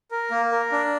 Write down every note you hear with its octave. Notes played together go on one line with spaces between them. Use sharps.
A#4
A#3
A#4
D4